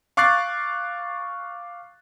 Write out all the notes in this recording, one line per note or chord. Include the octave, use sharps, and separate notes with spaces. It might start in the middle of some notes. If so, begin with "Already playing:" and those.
F5 C#6 D6 F#6 A6 C7